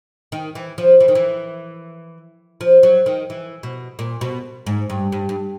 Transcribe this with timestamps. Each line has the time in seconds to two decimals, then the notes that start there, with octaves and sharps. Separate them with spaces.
0.32 D#3
0.55 E3
0.78 F3
1.00 E3
1.08 D#3
1.15 E3
2.61 F3
2.83 F#3
3.06 D#3
3.30 E3
3.63 B2
3.99 A#2
4.21 B2
4.66 G#2
4.90 G2
5.12 G2
5.29 G2